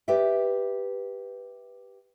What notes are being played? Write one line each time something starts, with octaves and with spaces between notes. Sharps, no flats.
G4 B4 D5 E5 G5